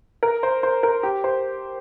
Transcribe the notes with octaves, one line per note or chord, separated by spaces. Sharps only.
A#4
C5
C5
A#4
G4
C5